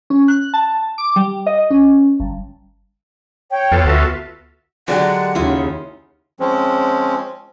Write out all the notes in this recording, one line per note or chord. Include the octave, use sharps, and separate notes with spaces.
C#4
F#6
A5
D6
G3
D#5
C#4
G1
C#5 G5
F2 B3 F4 A4
D2 F#4 E5
D3 F#3 G#3 D4 G4 F#5
D#2 C#3 E4 F4 D#5
F3 G#3 C4 C#4